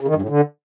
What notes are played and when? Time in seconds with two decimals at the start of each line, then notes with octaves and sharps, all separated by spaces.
0.01 C#3
0.08 D#3
0.15 G2
0.22 A2
0.29 D3